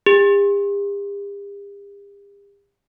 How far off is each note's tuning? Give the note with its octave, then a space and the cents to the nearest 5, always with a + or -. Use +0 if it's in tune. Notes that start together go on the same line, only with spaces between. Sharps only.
G4 +45